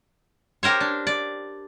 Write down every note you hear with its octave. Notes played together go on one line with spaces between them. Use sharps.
G4 A#4 C5 C#5
D4
D5